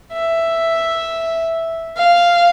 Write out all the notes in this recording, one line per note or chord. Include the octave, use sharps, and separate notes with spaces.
E5
F5